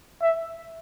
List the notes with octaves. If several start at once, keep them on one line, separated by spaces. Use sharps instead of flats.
E5